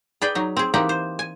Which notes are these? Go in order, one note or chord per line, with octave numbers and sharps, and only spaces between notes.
G#4 B4 D5 G5
F#3 D#4
C4 G#4
E3 A#3 C4 D#4 G4 F#5
C5
G#5